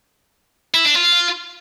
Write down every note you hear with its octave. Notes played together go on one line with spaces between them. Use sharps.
E4
D4
F4